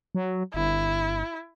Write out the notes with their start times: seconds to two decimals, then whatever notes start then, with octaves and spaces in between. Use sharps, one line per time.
0.15 F#3
0.54 G1 E4